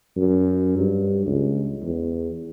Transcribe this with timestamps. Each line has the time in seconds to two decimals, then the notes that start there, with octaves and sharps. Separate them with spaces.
0.17 F#2
0.78 G2
1.26 C#2
1.83 E2